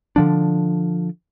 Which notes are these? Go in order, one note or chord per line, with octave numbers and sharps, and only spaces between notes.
D3 F3 D4